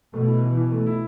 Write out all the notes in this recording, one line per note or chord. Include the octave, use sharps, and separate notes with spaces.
B2 A3
E4
E3
E3
A3
E4